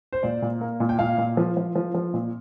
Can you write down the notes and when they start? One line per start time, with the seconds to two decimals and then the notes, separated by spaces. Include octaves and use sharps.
0.13 C5
0.23 A#2 D5
0.42 A#2
0.61 A#3
0.80 A#2
0.89 G5
0.99 A#2 F5
1.18 A#2
1.37 F3
1.57 F3
1.75 F3
1.94 F3
2.14 A#2